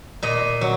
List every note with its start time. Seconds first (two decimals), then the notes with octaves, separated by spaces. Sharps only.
0.23 A#2 D#5
0.61 F#3